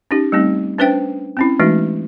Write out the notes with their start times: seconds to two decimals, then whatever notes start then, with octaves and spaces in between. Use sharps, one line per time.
0.11 C#4 D#4 G4
0.32 G3 A3 C4 D#4
0.78 C#4 D4 B4 C5 E5 G5
1.37 C4 C#4 E4
1.59 E3 G#3 A3 D#4 F#4